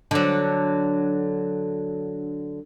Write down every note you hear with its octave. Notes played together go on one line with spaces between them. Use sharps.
D3 F#3